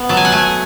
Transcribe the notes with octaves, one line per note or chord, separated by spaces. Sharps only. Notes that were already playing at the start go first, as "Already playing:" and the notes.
Already playing: B3
F#3 A5
G#5
F#5
A3 G#5